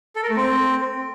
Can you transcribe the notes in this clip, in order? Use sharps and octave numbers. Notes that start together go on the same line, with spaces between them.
A4
A#4
A3
C4